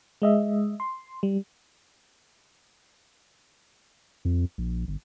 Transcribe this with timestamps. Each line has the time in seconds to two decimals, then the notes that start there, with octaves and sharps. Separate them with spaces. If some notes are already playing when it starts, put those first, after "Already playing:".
0.22 G#3 D#5 E5
0.80 C6
1.23 G3
4.25 F2
4.58 A#1
4.88 G1